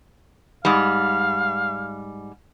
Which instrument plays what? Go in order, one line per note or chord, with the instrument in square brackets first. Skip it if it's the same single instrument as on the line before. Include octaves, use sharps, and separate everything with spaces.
[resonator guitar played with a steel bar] G#2 G3 [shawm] F5